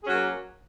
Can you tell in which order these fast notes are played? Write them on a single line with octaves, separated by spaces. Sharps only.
G#4 C#4 F#3 A#3